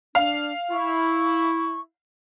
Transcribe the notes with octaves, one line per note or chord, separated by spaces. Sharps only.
D4 F5
E4 C#6